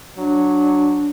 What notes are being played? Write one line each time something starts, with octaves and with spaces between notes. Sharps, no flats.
F#3 D4